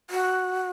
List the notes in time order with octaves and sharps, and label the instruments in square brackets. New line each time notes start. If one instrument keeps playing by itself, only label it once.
[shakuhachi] F#4